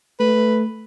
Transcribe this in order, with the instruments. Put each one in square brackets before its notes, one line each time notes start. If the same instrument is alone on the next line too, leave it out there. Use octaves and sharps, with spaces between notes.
[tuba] A3 [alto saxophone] B4